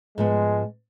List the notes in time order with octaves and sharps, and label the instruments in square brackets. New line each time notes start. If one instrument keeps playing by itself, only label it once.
[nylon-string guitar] G#2 F3 B3 [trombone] G#3